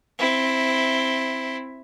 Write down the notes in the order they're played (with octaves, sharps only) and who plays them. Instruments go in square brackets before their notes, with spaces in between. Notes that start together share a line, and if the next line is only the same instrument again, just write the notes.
[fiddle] C4 E4